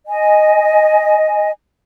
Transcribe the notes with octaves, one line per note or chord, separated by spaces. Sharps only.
D#5 G#5